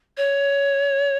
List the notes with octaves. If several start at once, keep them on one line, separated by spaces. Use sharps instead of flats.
C#5